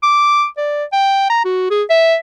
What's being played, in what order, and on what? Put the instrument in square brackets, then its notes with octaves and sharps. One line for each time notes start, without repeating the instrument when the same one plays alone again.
[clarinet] D6
D5
G5
A#5
F#4
G#4
E5